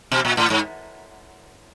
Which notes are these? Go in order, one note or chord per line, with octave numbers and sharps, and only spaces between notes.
B2
A#2
A2
G#2